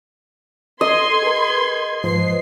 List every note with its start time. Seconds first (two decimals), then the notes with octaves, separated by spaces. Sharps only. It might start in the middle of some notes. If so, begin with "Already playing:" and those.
0.81 A4 D#5 C6 G#6
1.23 G#4 A#4 B4
2.04 G#2 F3 B4 C5 C7